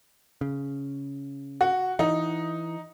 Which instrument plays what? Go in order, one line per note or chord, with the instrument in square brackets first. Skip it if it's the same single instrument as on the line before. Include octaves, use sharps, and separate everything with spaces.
[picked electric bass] C#3
[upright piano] F#4
[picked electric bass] E3 [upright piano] D#4